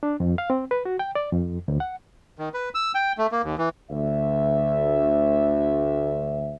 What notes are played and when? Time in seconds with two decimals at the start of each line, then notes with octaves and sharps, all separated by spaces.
0.03 D4
0.20 F2
0.38 F5
0.50 C4
0.71 B4
0.85 F#4
0.99 G5
1.15 D5
1.33 F2
1.68 D2
1.80 F#5
2.39 D#3
2.54 B4
2.74 E6
2.95 G5
3.18 A3
3.32 A#3
3.43 D#2
3.58 E3
3.90 D2 E5